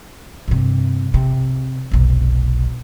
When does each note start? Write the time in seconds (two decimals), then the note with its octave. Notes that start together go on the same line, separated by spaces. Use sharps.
0.48 G2 C3
1.14 C3
1.92 F1 B1